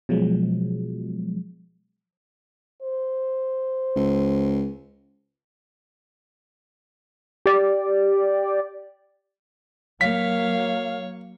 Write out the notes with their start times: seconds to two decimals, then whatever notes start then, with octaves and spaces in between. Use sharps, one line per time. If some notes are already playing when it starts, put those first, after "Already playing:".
0.09 B2 F3 F#3 G#3
2.82 C5
3.96 C#2
7.46 G4 D5
10.01 F#3 A#3 C#5 F5 B6